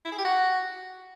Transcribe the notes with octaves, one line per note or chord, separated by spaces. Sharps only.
E4
G#4
G4
F#4